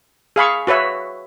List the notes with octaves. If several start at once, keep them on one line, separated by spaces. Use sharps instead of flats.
G#4 F5 B5 C#6
F#4 B4 C#5 E5